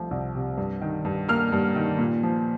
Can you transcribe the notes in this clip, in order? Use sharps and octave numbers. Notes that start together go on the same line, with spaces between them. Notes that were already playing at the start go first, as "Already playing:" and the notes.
Already playing: C2 F3 A3
C2
C3
G2
D#3
G2
A#3 F6
G2
D#3
A#2
F3